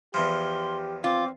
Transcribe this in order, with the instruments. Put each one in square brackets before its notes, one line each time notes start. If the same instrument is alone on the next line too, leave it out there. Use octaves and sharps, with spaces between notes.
[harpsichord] E2 E3 F3 [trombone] G4 [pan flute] C6
[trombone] C4 [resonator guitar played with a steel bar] F4 [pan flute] D6